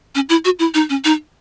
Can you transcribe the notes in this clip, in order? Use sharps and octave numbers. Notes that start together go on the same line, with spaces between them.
C#4
E4
F#4
E4
D#4
C#4
D#4